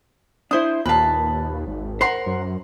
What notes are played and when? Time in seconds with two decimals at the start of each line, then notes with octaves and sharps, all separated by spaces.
0.51 D4 E4 C5 D#6
0.86 D#2 A#2 A#3 B4 A5
1.67 G#1
2.01 A#4 C5 F#5 C6
2.26 F#2